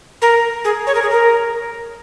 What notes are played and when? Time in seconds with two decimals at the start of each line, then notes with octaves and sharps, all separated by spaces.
0.22 A#4
0.64 G#4
0.87 C#5
0.95 A#4
1.02 G#4
1.10 A#4